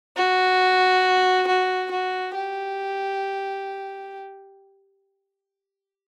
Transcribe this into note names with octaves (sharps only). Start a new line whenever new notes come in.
F#4
F#4
F#4
G4